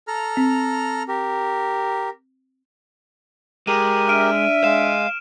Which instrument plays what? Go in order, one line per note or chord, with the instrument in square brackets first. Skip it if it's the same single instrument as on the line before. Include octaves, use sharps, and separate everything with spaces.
[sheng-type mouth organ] A4 A#5 F6
[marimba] C4
[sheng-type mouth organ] G4 A#4
[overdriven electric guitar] G#3 [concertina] G4 A#4 [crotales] D#7
[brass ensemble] D4 E5 [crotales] F6 D7 D#7
[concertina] G#3 [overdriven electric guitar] F5 [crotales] E7